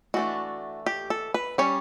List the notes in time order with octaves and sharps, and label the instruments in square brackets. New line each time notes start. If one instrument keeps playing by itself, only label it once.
[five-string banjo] E3 A3 D4 F#4
G4
A4
B4
G3 C#4 C#5